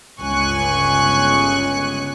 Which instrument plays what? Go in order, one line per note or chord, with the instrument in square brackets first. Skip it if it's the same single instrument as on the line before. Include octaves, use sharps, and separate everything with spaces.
[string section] G1 C#2 G#5 C#6 F#6